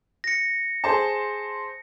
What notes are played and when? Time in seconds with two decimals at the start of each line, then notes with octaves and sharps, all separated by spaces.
0.24 A#6 C#7
0.84 G#4 C5 A5